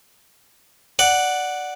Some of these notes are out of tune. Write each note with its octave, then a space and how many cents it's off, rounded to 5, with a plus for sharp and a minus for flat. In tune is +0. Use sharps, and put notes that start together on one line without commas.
D5 +0 F#5 +0